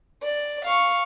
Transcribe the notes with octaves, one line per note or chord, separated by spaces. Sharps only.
D5
F5 C#6